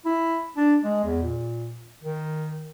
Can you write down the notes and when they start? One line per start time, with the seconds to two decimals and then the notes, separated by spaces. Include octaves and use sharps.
0.05 E4
0.57 D4
0.84 G#3
1.04 E2
1.23 A#2
2.04 D#3